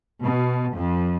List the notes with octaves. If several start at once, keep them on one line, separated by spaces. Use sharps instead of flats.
B2
F2